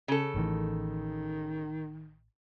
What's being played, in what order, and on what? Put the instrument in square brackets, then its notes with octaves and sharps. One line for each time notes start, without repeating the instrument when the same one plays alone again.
[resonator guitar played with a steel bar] C#3 A4
[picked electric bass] A1 A2 E3 [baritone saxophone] D#3